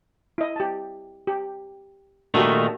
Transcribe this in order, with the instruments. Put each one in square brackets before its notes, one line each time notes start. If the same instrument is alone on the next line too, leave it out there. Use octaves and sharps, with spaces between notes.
[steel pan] E4 D#5
G4 A5
G4
[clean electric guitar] A#2 D#3 A3 [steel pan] D4 F#4 G4